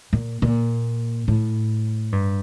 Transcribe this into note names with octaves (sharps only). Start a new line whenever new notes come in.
A#2
A#2
A2
G2